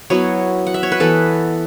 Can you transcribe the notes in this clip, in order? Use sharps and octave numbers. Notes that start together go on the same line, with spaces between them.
F#3 B3 E4 C#5
F#5
E5
C#5
B4
E3 B3 E4 A4